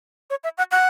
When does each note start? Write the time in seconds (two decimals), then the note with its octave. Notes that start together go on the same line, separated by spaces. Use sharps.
0.30 C#5
0.44 E5
0.58 F#5
0.71 F#5